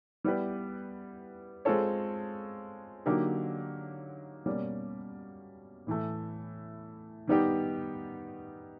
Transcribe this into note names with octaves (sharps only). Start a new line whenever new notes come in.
G3 B3 E4 G4 B4
G#3 C4 F4 A4 C#5
D3 F#3 A#3 D#4 G4
B2 G3 A#3 C#4
A2 E3 A3
D#3 G3 B3 D#4 G4